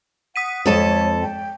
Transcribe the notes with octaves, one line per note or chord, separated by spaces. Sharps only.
F#5 D#6 B6 D#7
F2 G#3 A4 C#5 A5
G5